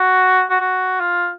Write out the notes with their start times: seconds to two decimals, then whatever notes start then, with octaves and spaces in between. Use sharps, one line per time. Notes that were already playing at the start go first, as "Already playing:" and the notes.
Already playing: F#4
0.50 F#4
0.60 F#4
1.00 F4